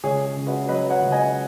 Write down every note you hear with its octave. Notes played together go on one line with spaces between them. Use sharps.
C#2 G#4 C#5
G#4
C#3
F#4 B4
F#3 B4 D#5
C#5 F#5
C#2
D#5 G#5